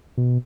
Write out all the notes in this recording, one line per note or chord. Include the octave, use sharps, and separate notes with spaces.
B2